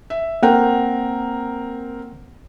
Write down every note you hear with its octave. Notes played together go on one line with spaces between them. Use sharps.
E5
A#3 C4 A#4 F#5 G5